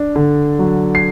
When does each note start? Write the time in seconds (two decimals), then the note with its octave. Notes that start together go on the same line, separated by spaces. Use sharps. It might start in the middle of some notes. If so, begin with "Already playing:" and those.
Already playing: D4
0.16 D3
0.59 F#3
0.95 C7